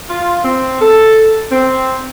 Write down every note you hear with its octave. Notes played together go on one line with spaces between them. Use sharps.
F4
C4
A4
C4